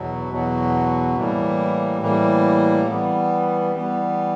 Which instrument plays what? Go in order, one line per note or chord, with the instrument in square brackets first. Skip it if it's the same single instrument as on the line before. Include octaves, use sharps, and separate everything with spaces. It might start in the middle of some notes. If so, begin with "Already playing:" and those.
Already playing: [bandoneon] E2 B2 F#3
E2 B2 F#3
A2 E3 G3 A#3
A2 E3 G3 A#3
E3 G3 B3
E3 G3 B3